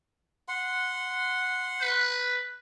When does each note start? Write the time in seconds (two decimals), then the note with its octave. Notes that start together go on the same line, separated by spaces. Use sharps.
0.48 F#5 C6
1.81 B4